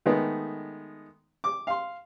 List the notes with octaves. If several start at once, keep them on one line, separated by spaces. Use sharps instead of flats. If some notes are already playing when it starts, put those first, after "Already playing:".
D#3 G#3 A3 B3
D6
F5 C6